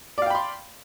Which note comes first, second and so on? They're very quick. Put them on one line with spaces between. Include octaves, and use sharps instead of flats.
D5 F5 G5 B5 C6